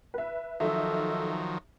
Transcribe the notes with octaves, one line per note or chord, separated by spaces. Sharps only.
B4 E5
D#3 F3 F#3 D#4 A4 E5